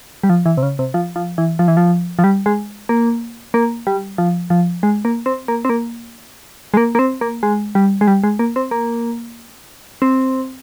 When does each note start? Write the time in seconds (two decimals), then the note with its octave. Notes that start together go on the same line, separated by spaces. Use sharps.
0.23 G3
0.29 F3
0.46 E3
0.57 C3
0.63 C#3
0.79 C3
0.94 F3
1.16 F3
1.38 E3
1.59 F3
1.68 E3
1.77 F3
2.19 F3
2.24 G3
2.46 G#3
2.89 A#3
3.54 A#3
3.87 G3
4.18 F3
4.50 F3
4.83 G#3
5.05 A#3
5.26 C4
5.48 A#3
5.65 C4
5.69 A#3
6.74 G#3
6.77 A#3
6.95 A#3
6.99 C4
7.21 A#3
7.43 G#3
7.75 G3
8.01 G#3
8.07 G3
8.24 G#3
8.39 A#3
8.56 C4
8.71 A#3
10.02 C4